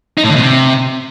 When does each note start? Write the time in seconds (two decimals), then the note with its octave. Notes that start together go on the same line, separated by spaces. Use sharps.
0.18 D#4
0.24 A2
0.30 D3
0.36 B2
0.42 C3